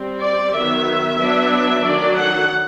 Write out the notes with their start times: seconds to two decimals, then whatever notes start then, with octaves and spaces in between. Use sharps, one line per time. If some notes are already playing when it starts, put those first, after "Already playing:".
Already playing: G3 C4
0.22 D5
0.54 D#3 F#3 B3 E5
1.18 F#3 B3 D4
1.82 D#3 F#3 A3 D4 D5
2.15 F#5